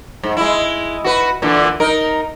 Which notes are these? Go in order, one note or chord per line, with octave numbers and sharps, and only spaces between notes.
G#2
G#3 E4
F#4 B4
A#2 D3 E3
D#4 A#4